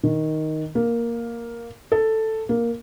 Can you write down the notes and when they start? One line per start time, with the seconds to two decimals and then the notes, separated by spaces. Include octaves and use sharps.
0.03 D#3
0.75 A#3
1.92 A4
2.49 A#3